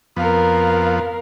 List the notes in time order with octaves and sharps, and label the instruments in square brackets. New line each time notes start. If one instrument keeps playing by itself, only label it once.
[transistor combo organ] F2 B3 [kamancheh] A#4 F5